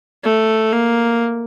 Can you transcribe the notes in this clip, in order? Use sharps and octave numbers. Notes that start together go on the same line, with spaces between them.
A3
A#3